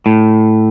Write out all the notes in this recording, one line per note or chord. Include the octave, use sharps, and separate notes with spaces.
A2